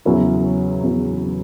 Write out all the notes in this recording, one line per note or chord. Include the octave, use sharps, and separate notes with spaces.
E2 C#3 F#3 C#4 E4
E2 C#3 F#3 C#4 E4